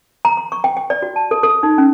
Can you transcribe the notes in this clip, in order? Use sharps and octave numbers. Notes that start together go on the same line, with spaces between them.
A#5
C6
C#6
G5
G5
D5
F#4
A5
A4
A4
D#4
C#4